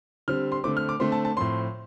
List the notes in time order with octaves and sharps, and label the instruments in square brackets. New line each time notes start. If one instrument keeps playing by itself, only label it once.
[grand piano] D3 G3 C4 F6
C6
D3 A3 C4 D6
F6
D6
D3 A3 C4 C6
A5
A5
A2 F3 C4 C6